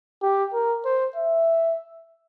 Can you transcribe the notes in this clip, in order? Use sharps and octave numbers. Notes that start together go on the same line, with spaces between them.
G4
A#4
C5
E5